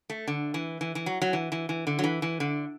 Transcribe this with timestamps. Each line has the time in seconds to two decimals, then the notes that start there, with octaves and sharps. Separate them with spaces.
0.10 A3
0.28 D3
0.54 E3
0.81 E3
0.95 E3
1.06 F#3
1.22 F#3
1.33 E3
1.52 E3
1.69 E3
1.87 D3
1.99 F#3
2.04 E3
2.22 E3
2.40 D3